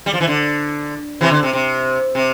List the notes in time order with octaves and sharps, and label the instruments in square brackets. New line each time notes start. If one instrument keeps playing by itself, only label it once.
[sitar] G3
F3
E3
D3
C3 E3
D3
C3
C3
C3